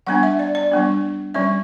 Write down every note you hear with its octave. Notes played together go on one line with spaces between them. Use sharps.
G3 B3 D4 F#5
E5
D5
D5
G3 B3 D4
G3 C#4 E5